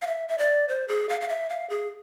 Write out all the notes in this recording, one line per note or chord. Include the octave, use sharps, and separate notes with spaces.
F5
E5
E5
D5
C5
G#4
F5
F5
E5
F5
G#4